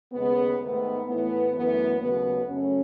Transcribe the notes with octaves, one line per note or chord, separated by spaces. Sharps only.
D#2 C#3 G#3 B3
G#2 D#3 A3 B3
A2 E3 A3 B3
F#2 E3 A3 B3
D#2 C#3 F#3 A3 B3
F#2 C#3 F#3 A3 C#4